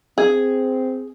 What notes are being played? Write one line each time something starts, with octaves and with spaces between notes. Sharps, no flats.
C4 G#4